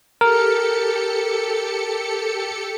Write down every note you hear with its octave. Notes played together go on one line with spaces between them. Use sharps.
G4 A4 A#4 C#7